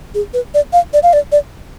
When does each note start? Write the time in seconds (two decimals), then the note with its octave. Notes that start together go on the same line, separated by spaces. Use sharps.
0.14 G#4
0.33 B4
0.54 D5
0.73 F5
0.93 D5
1.03 F5
1.13 D5
1.32 D5